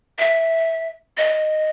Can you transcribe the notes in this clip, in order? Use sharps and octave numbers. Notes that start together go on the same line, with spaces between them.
E5
D#5